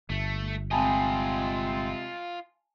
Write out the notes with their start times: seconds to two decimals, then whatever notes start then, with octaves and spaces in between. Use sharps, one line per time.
0.10 G1 A3
0.71 C3 G#3 C4 F4 D#5 G#5 A5 B5